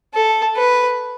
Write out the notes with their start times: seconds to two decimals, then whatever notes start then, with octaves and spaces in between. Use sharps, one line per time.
0.14 A4
0.56 B4